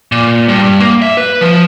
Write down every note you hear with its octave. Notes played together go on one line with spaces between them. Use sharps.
A#2
G2
A#3
E5
B4
F3